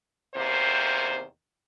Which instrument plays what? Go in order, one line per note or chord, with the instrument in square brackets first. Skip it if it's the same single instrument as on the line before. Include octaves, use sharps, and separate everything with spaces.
[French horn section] E2 C3 D#3 A#3 C5